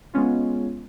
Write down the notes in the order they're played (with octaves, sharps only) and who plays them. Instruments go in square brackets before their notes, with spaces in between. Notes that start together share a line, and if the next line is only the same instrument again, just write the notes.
[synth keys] G#3 B3 C#4 F4